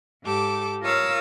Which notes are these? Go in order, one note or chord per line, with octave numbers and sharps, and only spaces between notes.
G#2 G4 A4 D6
F4 A#4 C#5 F5 D#6 E6